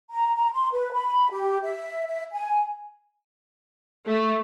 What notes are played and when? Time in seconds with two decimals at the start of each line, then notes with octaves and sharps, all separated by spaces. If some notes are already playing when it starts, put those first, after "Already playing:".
0.10 A#5
0.35 A#5
0.53 C6
0.72 B4
0.92 B5
1.31 G4
1.63 E5
2.06 E5
2.32 G#5
4.07 A3